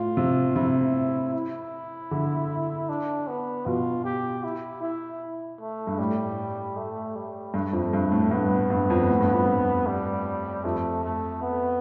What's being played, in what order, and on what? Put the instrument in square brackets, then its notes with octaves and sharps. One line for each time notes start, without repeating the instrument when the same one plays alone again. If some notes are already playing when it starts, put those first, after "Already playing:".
Already playing: [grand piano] A2 [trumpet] F4
[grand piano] C3
[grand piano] C3 [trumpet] E4
[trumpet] E4
[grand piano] D3
[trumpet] D4
B3
[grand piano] B2 [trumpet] F4
[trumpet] G4
E4
E4
A3
[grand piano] G2
[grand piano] A2 [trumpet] G3
[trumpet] A3
G3
[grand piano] G2 [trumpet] A3
[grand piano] F2
G2
A2
[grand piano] G2 [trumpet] B3
[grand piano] G2
F2
A2
G2
F2
G2
[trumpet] G3
[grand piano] F2 [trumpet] A3
[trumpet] A3
B3